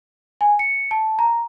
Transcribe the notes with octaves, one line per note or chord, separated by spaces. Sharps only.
G#5
C#7
A5
A#5